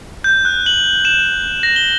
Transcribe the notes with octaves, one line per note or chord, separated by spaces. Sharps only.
G6
F#6
F#7
E7
A#6
G7